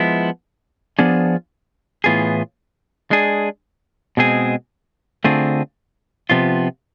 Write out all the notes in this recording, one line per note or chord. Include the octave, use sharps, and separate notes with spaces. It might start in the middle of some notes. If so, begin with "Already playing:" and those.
Already playing: F3 G#3 B3 E4
F3 B3 D4 F4 G#4
A2 E3 B3 F4 G#4
G#3 D4 G#4
B2 G#3 C4 G#4
D3 A3 C4 F4 G#4
C3 F3 B3 F4